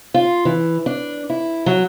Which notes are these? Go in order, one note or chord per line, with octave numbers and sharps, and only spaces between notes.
F4
E3
D4
E4
F#3